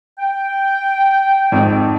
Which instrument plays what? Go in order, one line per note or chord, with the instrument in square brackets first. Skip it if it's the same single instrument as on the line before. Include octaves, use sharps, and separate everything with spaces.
[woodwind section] G5
[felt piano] G#1 F2 [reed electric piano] G#2 D#4